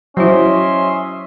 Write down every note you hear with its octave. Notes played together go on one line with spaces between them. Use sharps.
F#3 C#4 E4 C5 D#5 E5 C6